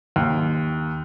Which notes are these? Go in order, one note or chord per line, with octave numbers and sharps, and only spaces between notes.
D#2